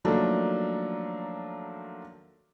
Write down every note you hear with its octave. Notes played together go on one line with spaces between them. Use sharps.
D#3 F3 F#3 A3 A#3 D4